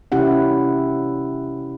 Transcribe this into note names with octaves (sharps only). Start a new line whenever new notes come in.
C3 C#4 E4 G4 F#5